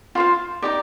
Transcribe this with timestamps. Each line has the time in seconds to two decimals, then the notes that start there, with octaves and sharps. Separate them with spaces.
0.15 F4 C5 F5
0.62 D#4 G4 D5